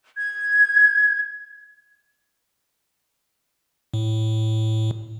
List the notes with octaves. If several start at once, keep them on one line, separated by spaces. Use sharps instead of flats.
G#6
A2